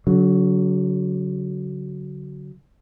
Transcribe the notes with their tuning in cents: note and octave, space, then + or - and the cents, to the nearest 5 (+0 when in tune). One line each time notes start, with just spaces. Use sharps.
D3 -45 F#3 +0